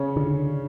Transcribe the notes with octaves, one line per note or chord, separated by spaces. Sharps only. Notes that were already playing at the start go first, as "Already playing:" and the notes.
Already playing: C#3 C#4
D3